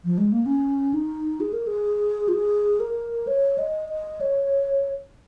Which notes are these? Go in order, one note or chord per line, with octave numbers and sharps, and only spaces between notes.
F3
G#3
A#3
C#4
D#4
G#4
A#4
G#4
F4
G#4
A#4
C#5
D#5
D#5
C#5